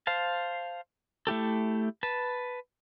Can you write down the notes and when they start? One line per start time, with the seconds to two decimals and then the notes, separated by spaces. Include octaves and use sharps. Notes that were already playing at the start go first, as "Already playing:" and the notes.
0.07 C5 F5 A5
1.27 A3 E4 G4 A4
2.03 B4 A5